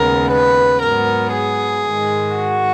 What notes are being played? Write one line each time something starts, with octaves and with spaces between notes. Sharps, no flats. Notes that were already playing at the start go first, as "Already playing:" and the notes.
Already playing: D#2 C#3 G#3 B3 A#4
B4
G#2 F#3 B3 A#4
G#4
G#2 D#3 G#3
F#4